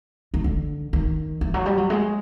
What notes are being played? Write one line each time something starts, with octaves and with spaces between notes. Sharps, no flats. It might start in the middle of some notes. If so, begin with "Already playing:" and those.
D#3
D3
D#3
E3
F#3
G3
F#3
G#3